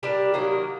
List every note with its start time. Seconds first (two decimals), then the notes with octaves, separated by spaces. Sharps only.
0.03 G3 D4 G4 A#4
0.34 D#3 F#3 A#3 D#4